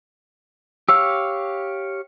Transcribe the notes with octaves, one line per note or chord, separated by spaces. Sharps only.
G4 C#5 F5 E6